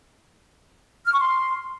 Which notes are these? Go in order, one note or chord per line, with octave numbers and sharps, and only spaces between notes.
F6
C#6
C6